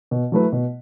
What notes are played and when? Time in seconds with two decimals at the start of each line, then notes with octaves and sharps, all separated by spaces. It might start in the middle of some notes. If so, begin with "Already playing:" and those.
0.11 B2
0.32 F#3 A3 E4 B4
0.52 B2